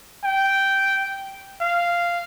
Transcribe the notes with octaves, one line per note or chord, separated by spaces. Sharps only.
G5
F5